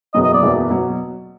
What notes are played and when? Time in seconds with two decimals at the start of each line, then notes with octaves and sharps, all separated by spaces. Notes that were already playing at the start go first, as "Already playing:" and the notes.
0.14 F#1 E2 B2 F#3 D#5
0.24 D#5
0.33 D5
0.42 F#1 E2 B2 F#3
0.70 B2 F#3